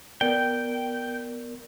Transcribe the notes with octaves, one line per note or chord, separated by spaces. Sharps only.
B3 A#4 D5 G5